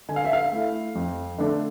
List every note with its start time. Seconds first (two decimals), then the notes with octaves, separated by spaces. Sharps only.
0.09 D3 G#5
0.16 F5
0.25 E5
0.33 F5
0.52 A3 E4
0.95 F2
1.38 D3 A3 D4